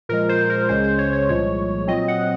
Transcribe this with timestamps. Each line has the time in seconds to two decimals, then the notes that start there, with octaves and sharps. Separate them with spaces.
0.09 A#2 F3 G#3 A#4
0.29 C5
0.50 A#4
0.69 C#2 C#3 G#3 C#4 C5
0.84 C5
0.98 C#5
1.13 C#5
1.29 C2 A#2 F3 G#3 C#5
1.87 A#2 F#3 C4 D#5
2.08 F#5